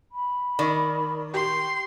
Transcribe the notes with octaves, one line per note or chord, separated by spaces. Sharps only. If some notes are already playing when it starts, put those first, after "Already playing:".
B5
D#3 D5 C#6
G4 C6